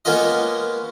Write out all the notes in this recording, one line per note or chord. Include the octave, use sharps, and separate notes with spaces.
G#3 A#3 B3 C#4 F4 D#5